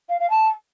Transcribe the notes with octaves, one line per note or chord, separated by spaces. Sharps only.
F5
F5
A5